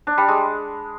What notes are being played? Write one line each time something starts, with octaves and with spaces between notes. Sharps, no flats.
D4
G3
G#3